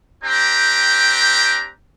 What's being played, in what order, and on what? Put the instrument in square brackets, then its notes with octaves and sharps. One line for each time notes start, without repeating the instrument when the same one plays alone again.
[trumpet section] C4 D4 G4 G5 A#5